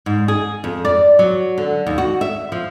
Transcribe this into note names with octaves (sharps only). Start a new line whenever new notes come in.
G#2
G#4
F2
D5
F#3
D3
D#2
F#4
E5
F3